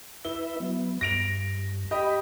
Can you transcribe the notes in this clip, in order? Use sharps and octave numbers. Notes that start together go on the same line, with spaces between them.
E4 B4 E5 G7
F#3 B3
G2 A#6 D7 F7
G4 D#5 B5